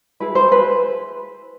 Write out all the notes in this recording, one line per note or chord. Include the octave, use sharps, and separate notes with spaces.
E4 G#4 B4
C5
B4